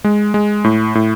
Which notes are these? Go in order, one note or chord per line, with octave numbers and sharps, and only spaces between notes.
G#3
G#3
A2
A2